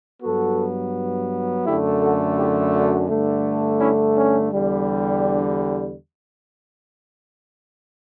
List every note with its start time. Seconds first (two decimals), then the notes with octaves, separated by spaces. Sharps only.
0.23 G2 F#3 B3 F#4 A4
1.65 F#2 D3 A3 E4 G4
2.01 F#4 A4
2.37 E4 G4
2.73 D4 F#4
3.09 G2 D3 A3
3.80 C#4 E4
4.15 C#4
4.52 E2 D3 G3
5.23 D4